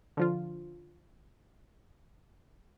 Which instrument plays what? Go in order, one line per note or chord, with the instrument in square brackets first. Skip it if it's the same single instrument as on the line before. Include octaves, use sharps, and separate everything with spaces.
[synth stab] D3 F3 F4